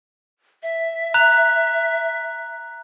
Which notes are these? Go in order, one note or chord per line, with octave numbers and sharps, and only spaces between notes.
E5
A#5 F#6 F7